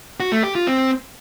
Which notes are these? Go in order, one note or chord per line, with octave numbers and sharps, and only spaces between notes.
F#4
A3
G4
F4
C4